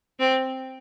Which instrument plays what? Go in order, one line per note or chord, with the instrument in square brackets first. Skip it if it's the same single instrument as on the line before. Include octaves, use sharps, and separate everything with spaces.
[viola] C4